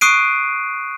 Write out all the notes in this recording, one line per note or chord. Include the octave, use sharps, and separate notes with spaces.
C#6 D#6 F#6 C7 D7 D#7